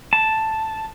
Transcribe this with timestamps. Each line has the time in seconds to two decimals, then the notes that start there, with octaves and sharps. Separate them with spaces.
0.13 A5